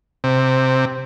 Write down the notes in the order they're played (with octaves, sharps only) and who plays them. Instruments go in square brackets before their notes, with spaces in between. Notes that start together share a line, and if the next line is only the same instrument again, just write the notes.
[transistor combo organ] C3